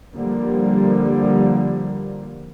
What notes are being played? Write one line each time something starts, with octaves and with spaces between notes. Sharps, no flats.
D3 F3 G3 A#3